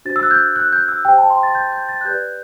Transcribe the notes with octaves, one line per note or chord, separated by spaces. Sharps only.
D4 F#4 C5 A6
E6
F#6
G6
F#6
G6
E6
G4 C5 G5
A5
C6
A6
G6
G6
A6
F#6
G4 B4 D5 G6